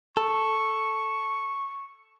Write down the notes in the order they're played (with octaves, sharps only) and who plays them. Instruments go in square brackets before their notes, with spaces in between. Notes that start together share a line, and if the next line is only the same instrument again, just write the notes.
[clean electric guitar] A4 [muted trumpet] C#6